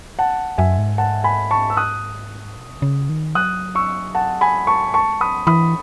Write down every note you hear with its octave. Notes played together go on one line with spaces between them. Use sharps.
F#5 A5
F#2 E5 G#5
G#2
F#5 A5
G#5 B5
A5 C#6
E6
D#6 F#6
B2
D#3
C#3
D#3
F#3 D#6 F#6
C#6 E6
F#5 A5
G#5 B5
A5 C#6
G#3 A5 C#6
F#3 B5 D#6
E3 B5 D#6